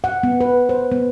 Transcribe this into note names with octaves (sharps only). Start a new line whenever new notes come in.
F#5
B3
B4
C5
B3